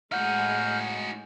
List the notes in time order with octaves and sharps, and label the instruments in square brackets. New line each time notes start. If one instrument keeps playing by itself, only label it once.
[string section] A2 G#3 [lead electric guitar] D#4 F#4 [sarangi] F#5 [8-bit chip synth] F6 G6